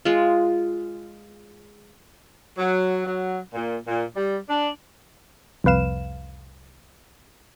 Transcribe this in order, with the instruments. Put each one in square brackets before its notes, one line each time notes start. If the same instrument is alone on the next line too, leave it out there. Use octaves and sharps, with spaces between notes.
[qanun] G#3 F4
[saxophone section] F#3
F#3
A#2
A#2
G3
D4
[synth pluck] C2 F2 B4 F5 E7